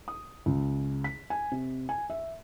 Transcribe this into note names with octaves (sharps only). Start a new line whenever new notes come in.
D#6
C#2
B6
G#5
C3
G#5
E5